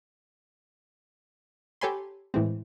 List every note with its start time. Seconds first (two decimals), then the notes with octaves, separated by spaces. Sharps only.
1.81 G4 A4 C#5 G#5 B5 C6
2.34 A2 E3 G#3 C4